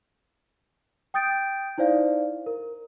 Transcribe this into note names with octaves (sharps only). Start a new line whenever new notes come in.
G5 D#6 G6 A6 D7
D#4 E4 C5 D5 F5
A#4